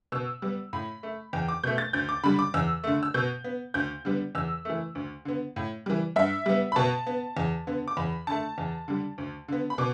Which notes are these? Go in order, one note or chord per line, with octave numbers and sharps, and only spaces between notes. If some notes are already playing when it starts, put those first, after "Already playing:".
B2 E6
G3 B3
A2 B5
A3
E2 G5
D6
B2 A3 G6
A6
D2 G6
D6
D3 G3 B5
D6
E2 E6
D3 A3
E6
B2 G6
B3
D2 G6
D3 G3 B3
E2 E6
E3 A3
D2
D3 B3
A2
E3 G3
G2 E5
G3 B3
B5
B2 A5
B3
E2
D3 B3
D6
E2 B5
D3 A3 A5
E2
D3 G3
D2
D3 B3
B5
B2 D6